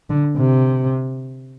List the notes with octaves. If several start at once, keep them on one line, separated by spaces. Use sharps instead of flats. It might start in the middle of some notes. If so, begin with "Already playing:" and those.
D3
C3